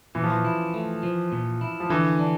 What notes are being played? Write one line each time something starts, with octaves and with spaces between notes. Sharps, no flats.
A#2 E3
F3
E3
E4
A3
F3
A#2
E4
F3
D3 E3
D4